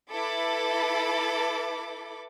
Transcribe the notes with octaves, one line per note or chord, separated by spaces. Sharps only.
E4 A4 B4 B5 D6